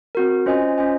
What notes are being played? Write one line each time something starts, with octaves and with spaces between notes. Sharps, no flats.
C4 F#4 A#4
C#4 F4 C5 D#5 G#5
C#4 F4 C5 D#5 G#5